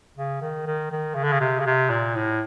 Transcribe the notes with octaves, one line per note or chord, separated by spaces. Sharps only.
C#3
D#3
D#3
D#3
C#3
D3
C#3
C3
C#3
C3
A#2
A2